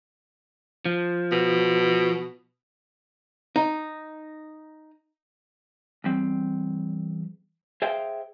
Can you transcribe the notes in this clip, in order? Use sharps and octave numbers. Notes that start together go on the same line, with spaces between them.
F3
B2
D#4
E2 G3 C4
G#4 C5 E5 F5 G5